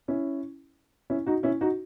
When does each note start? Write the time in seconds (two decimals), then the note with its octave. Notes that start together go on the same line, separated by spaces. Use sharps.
0.08 C#4 E4
1.10 C#4 E4
1.27 D#4 F#4
1.43 C#4 E4
1.61 D#4 F#4